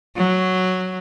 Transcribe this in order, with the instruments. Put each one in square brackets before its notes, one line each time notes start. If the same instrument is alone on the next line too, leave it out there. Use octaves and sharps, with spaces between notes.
[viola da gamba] F#3